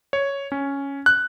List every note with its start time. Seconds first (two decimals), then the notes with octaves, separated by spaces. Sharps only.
0.13 C#5
0.52 C#4
1.06 F#6